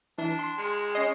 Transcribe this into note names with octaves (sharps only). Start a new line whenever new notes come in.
E3 D4
C6
G#3
C#4 D#5 C7